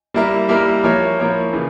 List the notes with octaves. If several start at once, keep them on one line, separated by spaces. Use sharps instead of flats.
G3 A#3 E4 A#4 E5
G3 A#3 E4 A#4 E5
F3 A#3 E4 A#4 C#5
F3 A#3 E4 A#4 C#5
C#3 E3